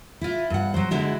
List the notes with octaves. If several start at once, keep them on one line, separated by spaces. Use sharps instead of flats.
E4 F4
G2 F#5
F#3 C5
D3 G#3 D4 E4 F#4